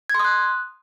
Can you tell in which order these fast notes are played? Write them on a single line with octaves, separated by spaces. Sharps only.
G#6 C6 D#6 F#6